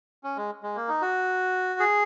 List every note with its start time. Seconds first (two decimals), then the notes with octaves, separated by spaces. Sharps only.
0.24 C#4
0.37 G#3
0.63 G#3
0.76 A#3
0.89 D#4
1.02 F#4
1.80 G#4